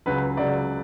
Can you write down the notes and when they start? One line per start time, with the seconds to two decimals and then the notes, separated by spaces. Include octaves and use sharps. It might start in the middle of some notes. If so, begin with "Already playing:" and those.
0.06 C#2 C#3 F#3 B4
0.37 C#2 C#3 F#3 D5